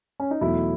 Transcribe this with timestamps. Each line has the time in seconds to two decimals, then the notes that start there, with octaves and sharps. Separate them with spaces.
0.20 C#4
0.31 D#4
0.41 E2 B2 F#3 A3 E4